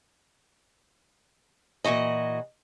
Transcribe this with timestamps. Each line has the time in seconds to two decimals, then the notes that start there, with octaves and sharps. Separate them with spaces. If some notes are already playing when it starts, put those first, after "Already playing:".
1.84 A#2 C#3 E3 F#4 D#5